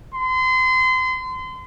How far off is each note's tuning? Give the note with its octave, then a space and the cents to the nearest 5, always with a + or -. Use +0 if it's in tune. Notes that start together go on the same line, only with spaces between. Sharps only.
C6 -30